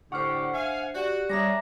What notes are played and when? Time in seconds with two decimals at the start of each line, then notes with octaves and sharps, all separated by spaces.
0.12 A2 D3 D4 G4 C5 F#5 C#6 F6
0.54 E5 F5 G#5
0.95 F#4 G4 D5 F#5
1.30 G3 C#4 D4 G#4 E5 A#5 D6 A#6